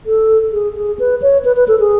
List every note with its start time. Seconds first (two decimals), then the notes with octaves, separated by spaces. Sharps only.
0.06 A4
0.52 G#4
0.76 G#4
0.99 B4
1.22 C#5
1.45 B4
1.56 B4
1.68 A4
1.80 G#4